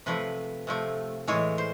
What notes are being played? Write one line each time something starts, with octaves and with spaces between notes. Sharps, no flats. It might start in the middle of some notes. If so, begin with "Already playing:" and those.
C3 F3 A3 B4
C3 F3 A3
A2 E3 G#3 C#5
C5